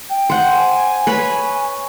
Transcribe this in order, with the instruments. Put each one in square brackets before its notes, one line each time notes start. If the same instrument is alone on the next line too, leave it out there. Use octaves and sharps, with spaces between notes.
[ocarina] G5
[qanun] C5 F#5
[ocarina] G#5
[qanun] B4 C#5 B5